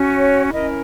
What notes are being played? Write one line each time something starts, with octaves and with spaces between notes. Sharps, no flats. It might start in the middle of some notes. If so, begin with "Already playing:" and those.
Already playing: C#4 F#4
C#5
C#4 E4 A#4 D#5